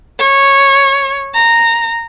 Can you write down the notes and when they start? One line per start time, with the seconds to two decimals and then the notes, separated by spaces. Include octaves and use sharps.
0.19 C#5
1.35 A#5